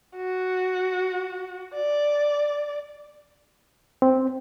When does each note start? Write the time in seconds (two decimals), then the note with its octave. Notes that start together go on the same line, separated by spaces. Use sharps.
0.16 F#4
1.75 D5
4.02 C4